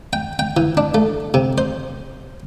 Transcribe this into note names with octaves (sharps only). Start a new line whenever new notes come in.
G5
G5
E3
D4
A3
C3
C5